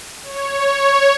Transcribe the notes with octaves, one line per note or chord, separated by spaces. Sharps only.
C#5